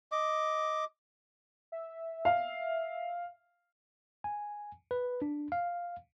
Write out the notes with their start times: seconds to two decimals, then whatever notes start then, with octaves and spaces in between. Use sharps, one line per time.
0.12 D#5 D6
1.72 E5
2.25 F5
4.24 G#5
4.91 B4
5.22 D4
5.52 F5